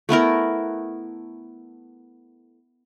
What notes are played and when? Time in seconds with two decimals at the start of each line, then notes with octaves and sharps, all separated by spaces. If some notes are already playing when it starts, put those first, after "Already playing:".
0.09 A3 B3 E4 A#4